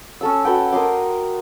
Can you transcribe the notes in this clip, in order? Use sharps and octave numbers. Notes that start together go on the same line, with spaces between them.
C#4 A4 E6
F#4 A4 B4 G5
A#4 D#5 C6 D6